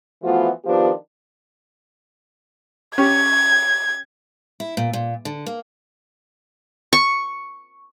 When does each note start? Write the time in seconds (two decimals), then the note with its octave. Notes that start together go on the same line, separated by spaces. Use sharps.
0.23 E3 F3 A3 B3 F4 F#4
0.65 D#3 F3 B3 D4 F4 G4
2.98 C#4 G4 G#6
4.60 E4
4.77 A#2
4.93 A#2
5.25 D3
5.46 A#3
6.93 C#6